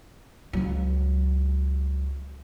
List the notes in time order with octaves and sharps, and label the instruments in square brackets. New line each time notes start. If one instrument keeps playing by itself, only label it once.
[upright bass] C#2 F#3